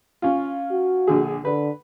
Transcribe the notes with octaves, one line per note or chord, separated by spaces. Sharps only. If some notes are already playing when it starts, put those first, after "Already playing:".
C#4 F4
F#4
A#1 D3 G#4
D3 B4